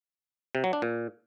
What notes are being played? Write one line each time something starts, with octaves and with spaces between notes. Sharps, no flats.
C3
F#3
D4
A#2